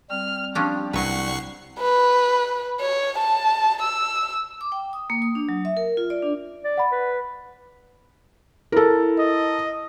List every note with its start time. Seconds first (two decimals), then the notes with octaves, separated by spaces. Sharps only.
0.10 G3 C4 F6
0.55 F3 C#4 D4 G4
0.93 C2 F#3 B4 F#5 C#6 C7
1.79 B4
2.80 C#5
3.19 A5
3.82 E6
4.61 D6
4.72 G5
4.93 D#6
5.10 A#3
5.22 D#6
5.35 D4
5.49 F#3
5.65 E5
5.77 A#4
5.97 F4
6.10 D5
6.22 D4
6.64 D5
6.77 F#5 B5
6.92 B4
8.72 E4 A4 A#4
9.19 D#5